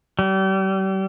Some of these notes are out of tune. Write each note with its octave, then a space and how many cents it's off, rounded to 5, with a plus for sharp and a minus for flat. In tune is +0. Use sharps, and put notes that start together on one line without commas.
G3 -35